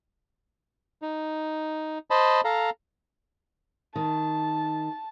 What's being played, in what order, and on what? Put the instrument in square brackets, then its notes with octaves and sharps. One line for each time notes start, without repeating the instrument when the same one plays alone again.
[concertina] D#4
C5 D#5 A5 B5
A4 F5 A#5
[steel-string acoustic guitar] D#3 [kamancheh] A5